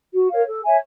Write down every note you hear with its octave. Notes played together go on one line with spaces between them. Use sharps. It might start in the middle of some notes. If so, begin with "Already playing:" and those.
F#4
A#4 C#5 F5
A4
C#5 E5 G#5